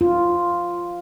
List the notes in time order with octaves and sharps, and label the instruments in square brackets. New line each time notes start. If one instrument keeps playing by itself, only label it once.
[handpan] F4